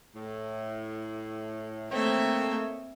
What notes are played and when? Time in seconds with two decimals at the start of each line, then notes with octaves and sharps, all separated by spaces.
0.15 A2
1.91 A3 A#3 C4 C#5 D#5 E5